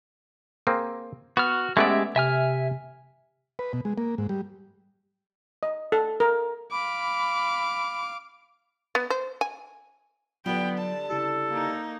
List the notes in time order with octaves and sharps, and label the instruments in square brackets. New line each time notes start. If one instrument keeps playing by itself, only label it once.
[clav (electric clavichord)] A#3 C4 G#4
[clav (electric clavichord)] B3 [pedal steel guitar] F#4 F6
[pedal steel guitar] G#3 G4 E5 [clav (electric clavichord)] A3 B3 D5 [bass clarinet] C#4
[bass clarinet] C3 [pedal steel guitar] E5 G#5 F6
[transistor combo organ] B4
B2
G#3
A#3
G#2
G3
[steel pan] D#5
A4
A#4
[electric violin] F5 D6 [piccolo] B5
[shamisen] B3
C5
G#5
[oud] D3 G3 [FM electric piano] F#3 F4 [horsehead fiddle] B3 G5
[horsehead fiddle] A5
[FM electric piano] C#3 E4 G4 [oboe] A4
[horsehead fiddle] A#3 D#4